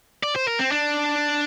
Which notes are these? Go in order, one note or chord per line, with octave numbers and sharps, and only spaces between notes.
D5
C5
A#4
C4
D4